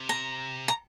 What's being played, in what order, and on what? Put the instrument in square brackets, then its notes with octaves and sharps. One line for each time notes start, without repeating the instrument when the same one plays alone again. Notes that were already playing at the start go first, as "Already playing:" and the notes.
Already playing: [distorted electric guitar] C3
[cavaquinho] A#5
A#5